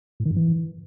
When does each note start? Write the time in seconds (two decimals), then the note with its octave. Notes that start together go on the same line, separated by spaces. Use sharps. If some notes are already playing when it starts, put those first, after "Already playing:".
0.20 A2
0.25 D#3
0.31 G2
0.36 E3